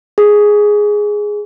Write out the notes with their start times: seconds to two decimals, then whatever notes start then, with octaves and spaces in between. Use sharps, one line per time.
0.18 G#4